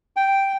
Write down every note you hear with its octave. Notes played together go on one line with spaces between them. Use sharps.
G5